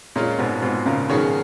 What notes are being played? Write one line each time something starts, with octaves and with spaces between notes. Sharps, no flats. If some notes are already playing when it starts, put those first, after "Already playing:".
A#2 G#3 C#4 F4
G#2 B2
G#2 B2
A#2 C#3
B2 D#3 F#3 C#4 G#4 C#5